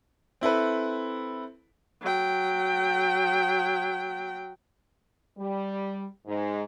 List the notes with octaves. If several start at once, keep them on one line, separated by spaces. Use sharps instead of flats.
C4 E4 A4 B4
F#3 G5
G3
G#2